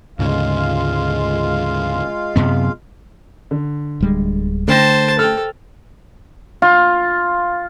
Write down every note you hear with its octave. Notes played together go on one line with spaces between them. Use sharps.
D2 G#2 C#3 G#3 F4 F5
F#2 C3 B3
D3
D1 G3 G#3
D3 A3 C5 G5 A5 A#6
A4 G5 F6
F4